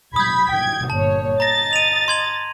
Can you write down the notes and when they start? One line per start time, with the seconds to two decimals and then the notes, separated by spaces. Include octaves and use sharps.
0.16 B5 D#6 G6 G#6 B6
0.51 G5 G#6
0.90 G1 A#2 C#5 A5
1.40 D#5 A#5 A6 A#6
1.73 D#7 F7
2.08 C6 G#6 F#7